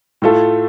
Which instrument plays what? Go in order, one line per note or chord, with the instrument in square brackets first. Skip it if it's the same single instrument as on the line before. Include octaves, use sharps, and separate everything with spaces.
[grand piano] A2 A3 F4 A4